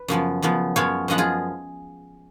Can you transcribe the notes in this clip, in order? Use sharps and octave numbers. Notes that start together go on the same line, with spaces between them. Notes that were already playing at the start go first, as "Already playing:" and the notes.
Already playing: B4
F#2 C#3 F3 B3
F#2 C#3 F3 B3
F#2 F3 G#3 B3 C#5 F5
F#2 F3 G#3 B3 D#5 F#5
F4 G#4